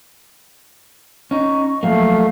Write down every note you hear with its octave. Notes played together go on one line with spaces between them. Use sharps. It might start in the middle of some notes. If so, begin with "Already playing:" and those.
C#4 D#4 C#6
F3 F#3 A3 A#3 F5